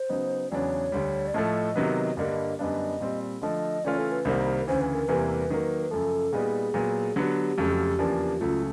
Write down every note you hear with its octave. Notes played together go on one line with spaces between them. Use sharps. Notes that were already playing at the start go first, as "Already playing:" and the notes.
Already playing: C5
C#3 F#3 B3 D#4
E2 C#3 F#3 B3 D4 C#5 D5
D2 D3 G3
D5
A2 F3 A3 D#5
C3 D#3 F#3 B3
G2 D3 G3 A#3 D#5
F#2 D3 G3 B3 D4 D#5 F5
A#2 G3 C4
D3 F3 A3 D#5
C#3 E3 A3 C#4 F4 D5
A4
B4
C2 C3 D#3 G3 A#3 C5
D2 C#3 E3 C5
B4
A#4
E2 C3 E3 G3 A#3 B4
D#3 F#3 A#3
F#2 C#3 F3 A4
A#2 G3 B3 D#4 G#4
A#2 F#3 B3
D3 F#3 B3 G4 G#4
F2 C#3 F#3 A3
E2 C#3 F3 A#3 D4
C#2 C#3 F#3 A3 F4